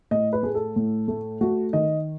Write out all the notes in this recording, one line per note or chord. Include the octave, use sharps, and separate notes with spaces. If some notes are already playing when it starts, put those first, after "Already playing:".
A2 D#5
B4
A3 G#4
A4
A2
A3
A3 F#4
D#3 D#5